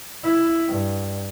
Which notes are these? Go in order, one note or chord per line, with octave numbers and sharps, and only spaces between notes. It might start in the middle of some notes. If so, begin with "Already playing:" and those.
E4
G2